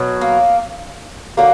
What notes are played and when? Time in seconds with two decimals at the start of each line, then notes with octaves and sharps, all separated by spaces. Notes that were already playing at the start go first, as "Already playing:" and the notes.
Already playing: B2 F#3
0.21 A#3
1.37 D3 F#3 A#3